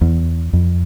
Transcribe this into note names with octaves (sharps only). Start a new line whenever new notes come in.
E2
F2